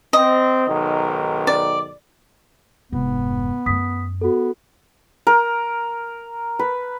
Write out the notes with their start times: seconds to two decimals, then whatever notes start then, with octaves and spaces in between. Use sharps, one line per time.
0.13 C4 D#5
0.68 B1 G#2 D#3
1.47 D5
2.92 F1 G#2 B3
3.66 F#2 A3 D#6 B6
4.21 B3 F#4 A4
5.27 A#4
6.59 B4